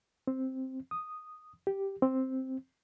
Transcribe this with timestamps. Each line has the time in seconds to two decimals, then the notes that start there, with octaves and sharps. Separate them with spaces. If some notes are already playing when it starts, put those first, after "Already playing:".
0.27 C4
0.91 D#6
1.67 G4
2.02 C4